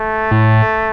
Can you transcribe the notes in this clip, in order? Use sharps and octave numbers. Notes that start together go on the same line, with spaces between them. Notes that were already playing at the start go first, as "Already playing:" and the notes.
Already playing: A3
A2